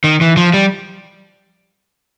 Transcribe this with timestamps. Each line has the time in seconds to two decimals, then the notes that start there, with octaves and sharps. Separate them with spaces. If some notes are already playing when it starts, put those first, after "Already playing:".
0.04 D#3
0.21 E3
0.37 F3
0.53 G3